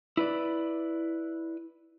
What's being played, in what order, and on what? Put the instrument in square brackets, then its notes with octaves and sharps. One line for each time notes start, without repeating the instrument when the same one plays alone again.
[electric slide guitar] E4 B4 D5